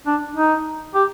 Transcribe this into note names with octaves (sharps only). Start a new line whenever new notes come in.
D4
D#4
G4